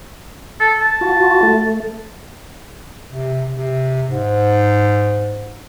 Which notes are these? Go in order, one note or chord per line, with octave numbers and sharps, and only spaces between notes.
A4
A5
F4 F#4
A3
C3
C3
G#2